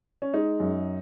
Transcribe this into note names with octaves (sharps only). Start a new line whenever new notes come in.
C#4
G#3 D#4
F#2